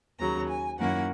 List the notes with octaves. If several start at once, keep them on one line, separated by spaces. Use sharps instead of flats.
D#2 C#3 F#3 A#5
G#5
F#2 D#3 A#3 C#4 E4 F#5